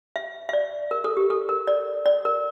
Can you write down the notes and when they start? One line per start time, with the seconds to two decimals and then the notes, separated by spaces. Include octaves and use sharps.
0.16 E5
0.49 E5
0.53 D5
0.91 A#4
1.04 A4
1.17 G4
1.30 A4
1.49 A#4
1.67 D5
2.06 D5
2.25 A#4